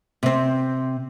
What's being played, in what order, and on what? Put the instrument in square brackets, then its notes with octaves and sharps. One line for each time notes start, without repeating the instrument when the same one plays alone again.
[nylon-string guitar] C3 C4